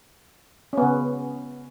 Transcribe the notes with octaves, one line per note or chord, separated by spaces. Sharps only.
C#3 B3 C#4